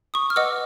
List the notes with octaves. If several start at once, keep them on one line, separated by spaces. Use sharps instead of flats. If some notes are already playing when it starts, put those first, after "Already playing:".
C#6 D#6
F6
B4 D#5 F#5 D6 E6